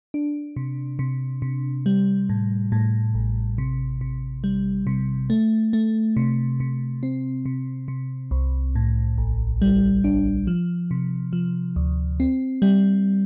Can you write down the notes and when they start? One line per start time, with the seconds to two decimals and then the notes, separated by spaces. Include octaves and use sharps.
0.14 D4
0.56 C3
0.99 C3
1.42 C3
1.86 G3
2.29 A2
2.72 A2
3.14 A1
3.58 C3
4.01 C3
4.44 G3
4.87 C3
5.30 A3
5.73 A3
6.17 C3
6.60 C3
7.03 C4
7.46 C3
7.88 C3
8.31 C2
8.75 A2
9.18 A1
9.62 G3
10.04 D4
10.47 F3
10.91 C3
11.33 F3
11.76 D2
12.20 C4
12.62 G3